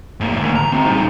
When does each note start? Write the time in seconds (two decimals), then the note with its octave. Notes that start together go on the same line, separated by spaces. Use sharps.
0.20 G#2 A#3
0.41 D2
0.56 A#5
0.72 C4 F#4
0.87 G3 D#4